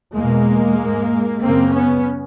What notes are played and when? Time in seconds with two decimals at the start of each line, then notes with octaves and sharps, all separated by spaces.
0.16 E2 B2 G#3 A#3
0.79 G#2
1.42 F#2 C#3 A#3 C4
1.74 B3 C#4